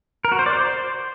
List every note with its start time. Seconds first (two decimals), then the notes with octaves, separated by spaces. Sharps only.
0.25 A#4
0.32 F#4
0.39 C5
0.46 D5
0.53 C5